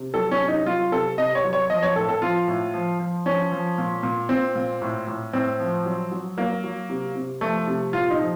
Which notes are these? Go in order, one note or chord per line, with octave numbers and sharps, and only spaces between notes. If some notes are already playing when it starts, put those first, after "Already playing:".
Already playing: C3
F#3 A4
C#4
C3
D#4
F#3 F4
C3 A4
C3 D#5
C#5
F#3
C#5
F3 D#5
C#5
A2 A4
A4
F3 F4
A2
F3
F3
F3 C#4
F3
A#2
A#2
A#2 C4
A#2
A2
A2
A2 C4
F3
F#3
F#3
F#3 A#3
F#3
C3
C3
F3 A3
C3
A#2 F4
D#4
F3